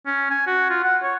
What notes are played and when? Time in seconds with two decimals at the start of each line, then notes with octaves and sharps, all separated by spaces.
0.06 C#4
0.31 G#5
0.47 F#4
0.70 F4
0.84 F#5
1.03 C#5